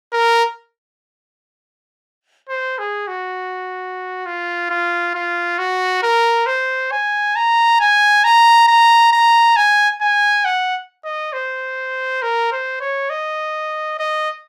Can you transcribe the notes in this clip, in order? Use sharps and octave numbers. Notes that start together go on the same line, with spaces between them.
A#4
C5
G#4
F#4
F4
F4
F4
F#4
A#4
C5
G#5
A#5
G#5
A#5
A#5
A#5
G#5
G#5
F#5
D#5
C5
A#4
C5
C#5
D#5
D#5